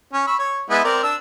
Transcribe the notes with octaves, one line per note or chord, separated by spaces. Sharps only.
C#4
B5 C#6 E6
C#5
G#3 B3 E4
C4 A#4 D5
D4 E6